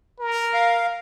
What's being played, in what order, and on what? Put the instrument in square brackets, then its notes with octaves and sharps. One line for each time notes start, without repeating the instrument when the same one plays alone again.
[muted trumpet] A#4
[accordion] F5